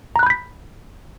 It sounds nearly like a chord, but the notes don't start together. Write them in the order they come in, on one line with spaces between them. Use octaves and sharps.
A#5 F#6 B5 G6 B6